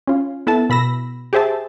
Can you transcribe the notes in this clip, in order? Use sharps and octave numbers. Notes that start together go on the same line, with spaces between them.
C#4 F4
B3 E4 A4 A5
B2 B5 E6 A#6
G4 G#4 C5 E5 A5